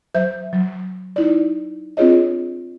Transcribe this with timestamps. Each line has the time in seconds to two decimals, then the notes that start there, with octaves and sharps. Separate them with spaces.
0.15 F#3 C5 E5 G6
0.53 F#3
1.16 D#4 E4 D5
1.97 C4 D4 F4 G#4 C#5 D#5